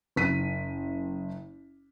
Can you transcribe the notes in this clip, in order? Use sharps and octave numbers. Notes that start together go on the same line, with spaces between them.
F#1 B6 D#7